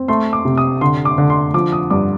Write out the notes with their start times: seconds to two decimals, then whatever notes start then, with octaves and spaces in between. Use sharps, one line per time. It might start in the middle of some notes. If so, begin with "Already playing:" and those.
Already playing: C4
0.08 A3 C6
0.33 D6
0.45 C3
0.58 D#6
0.81 D3 C6
1.05 D6
1.18 D3
1.30 C6
1.54 F3 D6
1.72 D#6
1.90 G2 D6